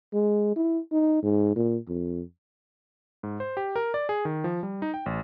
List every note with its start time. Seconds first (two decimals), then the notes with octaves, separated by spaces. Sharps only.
0.13 G#3
0.56 E4
0.92 D#4
1.23 G#2
1.56 A#2
1.88 F2
3.23 G#2
3.40 C5
3.57 G4
3.76 A#4
3.94 D5
4.09 G#4
4.25 D#3
4.44 F3
4.63 G3
4.82 D#4
4.94 G5
5.06 A1